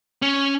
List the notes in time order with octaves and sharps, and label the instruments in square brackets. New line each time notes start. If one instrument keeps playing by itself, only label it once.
[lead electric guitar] C#4